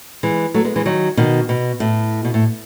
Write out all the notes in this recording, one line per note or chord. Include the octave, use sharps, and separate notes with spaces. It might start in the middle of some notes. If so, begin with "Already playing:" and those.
E3 G#3
F#3 A3
G#3 B3
E3 G#3
D#3 F#3
B2 D#3
B2
A2
B2
A2